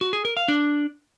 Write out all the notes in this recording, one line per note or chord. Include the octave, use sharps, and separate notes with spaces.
F#4
G#4
A#4
F5
D4